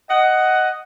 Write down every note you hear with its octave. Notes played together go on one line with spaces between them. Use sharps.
D#5 F#5